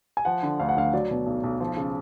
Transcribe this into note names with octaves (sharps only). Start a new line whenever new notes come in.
G#5
F3 F#5
D3
D2 F5
F#5
D2 F5
F#3 D5
B2
B1
B1
F3
C#3